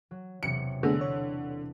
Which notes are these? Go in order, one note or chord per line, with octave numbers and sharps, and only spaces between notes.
F#3
E1 C3 F#3 C#7
D3 A3 B3 G#4 E6 A#6
C#5